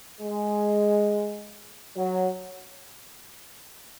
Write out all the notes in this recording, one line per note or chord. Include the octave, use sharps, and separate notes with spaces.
G#3
F#3